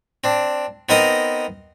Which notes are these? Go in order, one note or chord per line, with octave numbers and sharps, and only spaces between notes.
C4 D4
B3 C4 D#4 A#4 D#5 A#5